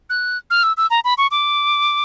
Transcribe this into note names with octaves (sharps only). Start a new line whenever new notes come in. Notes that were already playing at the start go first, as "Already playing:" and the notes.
F#6
F6
E6
E6
A#5
B5
C#6
D6